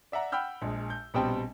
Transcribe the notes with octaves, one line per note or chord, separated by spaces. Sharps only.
D5 E5 F#5 A#5
F#5 G5 B5 E6 F6 G6
A#1 G#3
G6
A#1 B2 G3 C4 G5 A5